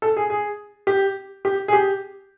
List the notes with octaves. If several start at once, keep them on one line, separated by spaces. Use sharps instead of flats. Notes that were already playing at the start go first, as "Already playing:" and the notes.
A4
G#4
G#4
G4
G4
G#4
G4